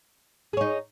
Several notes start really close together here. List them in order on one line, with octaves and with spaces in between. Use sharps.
G#4 C#5 D#4